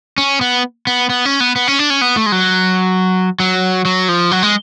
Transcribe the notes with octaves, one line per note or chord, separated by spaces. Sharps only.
C#4
B3
B3
B3
C#4
B3
B3
C#4
D4
C#4
B3
A3
G#3
F#3
F#3
F#3
F3
F#3
G#3